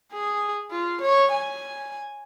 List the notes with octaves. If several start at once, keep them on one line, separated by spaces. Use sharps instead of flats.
G#4
F4
C#5
G#5